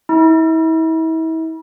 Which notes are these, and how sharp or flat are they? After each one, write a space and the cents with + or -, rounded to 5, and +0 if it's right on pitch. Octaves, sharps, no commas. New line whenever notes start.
E4 -40